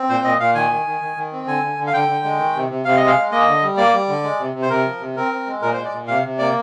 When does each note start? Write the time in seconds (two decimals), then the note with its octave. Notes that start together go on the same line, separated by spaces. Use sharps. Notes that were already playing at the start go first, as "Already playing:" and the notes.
Already playing: C4
0.09 A#2 C5
0.24 A#2 D#5
0.39 A#2 F5
0.55 D#3 G#5
0.70 D#3
0.86 D#3
1.01 D#3
1.16 D#3
1.32 C4
1.47 D3 G#5
1.63 D3
1.78 D3
1.87 F5
1.93 D3 G5
2.08 D3
2.25 G#3
2.39 D#3
2.55 C3
2.70 C3
2.85 C3 F5
2.97 G#3 D#5
3.07 F5
3.16 G#3
3.31 A#3 D#5
3.47 D3
3.63 G3
3.77 A#3 D5
3.93 G3
4.08 D3
4.24 G#3
4.40 C3
4.54 C3
4.62 C5
4.70 C3 A#4
4.86 F3
5.00 C3
5.16 C4 A#4
5.32 C4
5.47 G#3
5.62 A#2 A#4
5.73 C5
5.77 G#3
5.85 D5
5.93 A#2
6.08 C3 F5
6.24 C3
6.38 A#3 D5